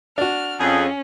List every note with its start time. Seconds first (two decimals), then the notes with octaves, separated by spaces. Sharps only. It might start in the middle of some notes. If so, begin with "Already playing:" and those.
0.18 D4 F#4 F6
0.60 F2 C#4 G#4